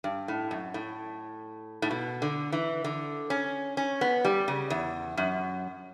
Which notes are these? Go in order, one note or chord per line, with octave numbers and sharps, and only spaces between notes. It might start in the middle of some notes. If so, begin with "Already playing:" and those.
G2
A2
F#2
A2
A2
B2
D3
E3
D3
C#4
C#4
B3
G3
C#3
E2
F#2